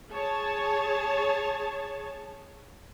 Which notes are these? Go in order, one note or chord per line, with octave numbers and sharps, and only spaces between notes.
G#4 C#5 A5